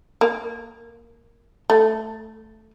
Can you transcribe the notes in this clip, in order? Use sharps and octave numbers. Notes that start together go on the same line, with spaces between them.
A#3
A3